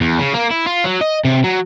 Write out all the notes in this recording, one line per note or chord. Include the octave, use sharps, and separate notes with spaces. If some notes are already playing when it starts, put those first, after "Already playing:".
E2
C#3
A#3
E4
F4
F#3
D#5
C3
F#3